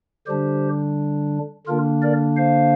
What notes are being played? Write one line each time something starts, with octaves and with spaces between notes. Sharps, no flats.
D3 G3 D4 G4 C5
D3 A#3 D4 F4 A#4
A#4 D5
C5 F5